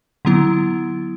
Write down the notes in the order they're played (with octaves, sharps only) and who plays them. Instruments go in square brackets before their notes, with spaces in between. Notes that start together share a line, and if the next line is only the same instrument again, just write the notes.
[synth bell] D3 F#3 B3 E4